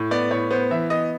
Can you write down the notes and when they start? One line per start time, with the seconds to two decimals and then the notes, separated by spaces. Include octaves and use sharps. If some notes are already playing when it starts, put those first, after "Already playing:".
Already playing: A2
0.11 B3 D5
0.31 A2 C#5
0.50 B3 C5
0.71 E3 E5
0.90 B3 D#5